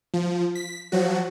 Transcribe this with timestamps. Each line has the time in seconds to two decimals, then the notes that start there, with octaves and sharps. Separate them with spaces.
0.14 F3
0.55 B6
0.92 F3 F#3 F#4